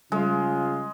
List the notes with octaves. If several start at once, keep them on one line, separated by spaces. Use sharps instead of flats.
C#3 G3 G#3 F4